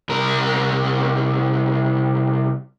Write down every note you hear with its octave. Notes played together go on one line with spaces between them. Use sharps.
C2 A#4